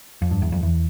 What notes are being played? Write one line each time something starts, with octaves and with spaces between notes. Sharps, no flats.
F2
G2
E2
F2
E2